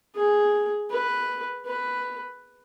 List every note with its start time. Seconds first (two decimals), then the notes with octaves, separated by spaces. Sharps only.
0.16 G#4
0.90 B4
1.66 B4